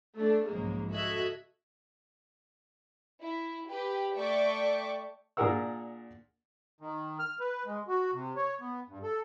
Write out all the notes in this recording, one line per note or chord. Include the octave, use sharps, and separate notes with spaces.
A3 D4
B1 G#2 C#3 F3 G#3 A#3
F#4 A4 D#5 E5 F#6 G#6
E4
G4 B4
A3 D5 E5 G5 C#6 D6
A#2 D4 G#4 A#4 F#5 E6
D#3
F6
B4
G#3
F#4
C3
C#5
B3
G2
A4